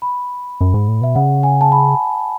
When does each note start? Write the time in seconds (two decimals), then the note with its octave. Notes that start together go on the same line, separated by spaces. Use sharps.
0.02 B5
0.61 F#2
0.74 G#2
0.88 A2
1.01 B2 E5
1.15 C#3 F#5
1.43 G#5
1.61 A5
1.72 B5